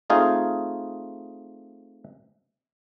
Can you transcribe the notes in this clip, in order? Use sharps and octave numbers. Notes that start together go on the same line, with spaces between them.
A3 C4 D#4 F4 G#4